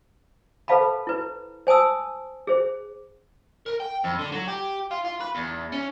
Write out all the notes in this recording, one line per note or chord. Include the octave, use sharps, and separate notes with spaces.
A4 B4 C5 F5 A5 B5
E4 B4
C5 G#5 A5 D#6 E6
G#4 C5
A#4
G5
F2
D3
F#3
G4
F4
F4
B4
E2
C#4